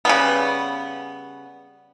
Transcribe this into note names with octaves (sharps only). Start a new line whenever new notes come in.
C#3 G3 B3